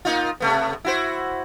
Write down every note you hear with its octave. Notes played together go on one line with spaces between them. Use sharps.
A#3 D#4 F4
C3 A3 B3
E4 F#4 C5